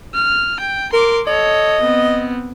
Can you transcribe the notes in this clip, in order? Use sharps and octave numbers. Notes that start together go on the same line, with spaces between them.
F6
G5
A#4 C6 D6
A4 C#5 D#5
B3 C4